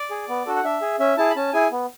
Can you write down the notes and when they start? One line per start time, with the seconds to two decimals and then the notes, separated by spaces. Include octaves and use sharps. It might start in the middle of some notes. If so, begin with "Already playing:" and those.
Already playing: D5
0.11 G#4
0.29 B3
0.46 D4 F#4 A4
0.56 F#5
0.64 D4 E5
0.82 G#4
0.99 C#4 E5
1.17 E4 G#4 A5
1.30 B5
1.36 C#4 A5
1.53 E4 G#4 G#5
1.72 B3